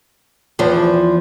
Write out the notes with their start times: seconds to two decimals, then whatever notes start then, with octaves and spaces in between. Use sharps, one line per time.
0.59 E2 F3